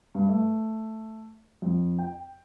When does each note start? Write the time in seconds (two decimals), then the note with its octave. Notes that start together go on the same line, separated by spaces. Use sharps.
0.15 G2
0.29 A3
1.62 F2
1.99 G5